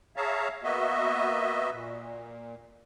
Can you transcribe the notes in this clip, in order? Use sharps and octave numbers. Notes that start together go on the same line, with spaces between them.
G#4 C#5 E5 F5 A5 A#5
A#3 B3 F#4 D#5 E5
A#2